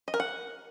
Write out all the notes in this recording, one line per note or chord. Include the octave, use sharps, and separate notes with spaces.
D#5
A#4
F#5